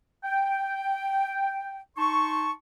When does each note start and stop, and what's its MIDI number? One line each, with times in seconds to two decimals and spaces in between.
0.25 1.80 79
1.97 2.51 63
1.97 2.51 81
1.97 2.51 84
1.97 2.51 85